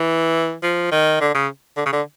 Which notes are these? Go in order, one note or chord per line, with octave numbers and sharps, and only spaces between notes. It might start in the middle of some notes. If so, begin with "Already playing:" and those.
Already playing: E3
F3
D#3
D3
C#3
D3
C#3
D3